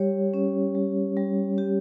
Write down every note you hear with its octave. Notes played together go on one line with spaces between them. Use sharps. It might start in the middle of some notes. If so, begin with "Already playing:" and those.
Already playing: G3 G4 C#5
C#4
G3
G3
G4